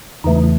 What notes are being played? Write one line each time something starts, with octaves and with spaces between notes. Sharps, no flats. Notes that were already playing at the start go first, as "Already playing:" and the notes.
E2 C#3 E3 A3 D#4
D#4